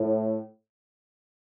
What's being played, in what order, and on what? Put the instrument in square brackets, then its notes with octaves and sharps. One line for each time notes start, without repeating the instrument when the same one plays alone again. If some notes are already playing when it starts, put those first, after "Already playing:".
Already playing: [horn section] A2